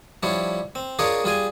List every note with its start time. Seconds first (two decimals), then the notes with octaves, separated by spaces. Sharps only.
0.23 F3 G3 D4 E4 C#5
0.75 C4
0.99 D4 F4 G#4 A#4 C#5 D#5
1.24 G3 F4 G#4 G#5